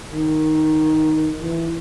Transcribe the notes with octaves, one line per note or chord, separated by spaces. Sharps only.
D#3
E3